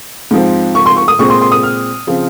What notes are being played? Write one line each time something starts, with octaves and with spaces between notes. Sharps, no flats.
G#2 F3 C4
C#6
C6
C#6
D#6
A#2 G#3 C4 C#6
C6
C6
D#6
F6
C#3 F3 C4